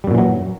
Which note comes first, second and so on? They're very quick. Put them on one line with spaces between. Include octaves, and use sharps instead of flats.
G3 F#2 A#2 E3 F#3